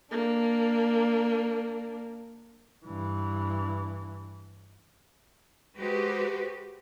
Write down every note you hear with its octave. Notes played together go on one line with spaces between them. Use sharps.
A#3 D4
G2 E3
G#3 F#4 G4 B4 C5